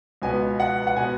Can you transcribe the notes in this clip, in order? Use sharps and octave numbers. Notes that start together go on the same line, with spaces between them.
C#2 B2 B3 G#5
F#5
F#5
B2 B3 G#5